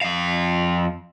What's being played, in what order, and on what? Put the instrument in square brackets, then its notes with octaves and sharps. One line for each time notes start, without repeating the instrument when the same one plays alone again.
[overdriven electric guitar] F2 F5